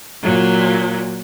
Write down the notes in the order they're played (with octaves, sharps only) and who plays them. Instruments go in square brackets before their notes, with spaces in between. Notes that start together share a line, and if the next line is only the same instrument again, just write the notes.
[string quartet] A#2 F#3